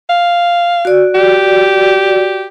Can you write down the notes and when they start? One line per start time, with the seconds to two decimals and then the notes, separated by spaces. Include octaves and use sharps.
0.09 F5
0.85 F#4 D5
1.15 G4